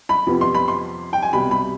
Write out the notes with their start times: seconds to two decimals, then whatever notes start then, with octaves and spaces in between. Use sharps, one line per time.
0.09 B5
0.27 F2 C3 F3 B3
0.41 C6
0.55 B5
0.68 C6
1.13 G5
1.22 G#5
1.33 C2 B2 G3 B5
1.51 B5